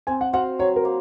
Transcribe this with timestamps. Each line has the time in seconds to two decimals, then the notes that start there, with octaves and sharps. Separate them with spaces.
0.07 C4 G#5
0.21 F#5
0.33 F#4 C5 F5 F#5
0.59 F#3 C#5
0.76 A#4
0.85 A#3